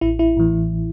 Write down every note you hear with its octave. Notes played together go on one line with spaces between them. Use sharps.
A1 E4
E4
A2 E3